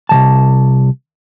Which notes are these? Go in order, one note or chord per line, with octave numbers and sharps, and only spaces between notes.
C2 C#3 A5